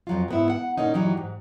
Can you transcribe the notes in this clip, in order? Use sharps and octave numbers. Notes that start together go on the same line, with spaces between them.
F2 F#3 F4
G#2 B3 E4
F#5
A#2 A#3 C#4 D#4
G2 E3 F#3 D#4 G4
G#2